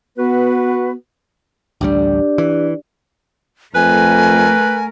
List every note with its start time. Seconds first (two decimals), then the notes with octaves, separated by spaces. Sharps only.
0.17 B3 F#4 B4
1.81 A1 D2 G3 D4 G4 D5
2.38 E3
3.75 F2 A3 A#4 B4 G#5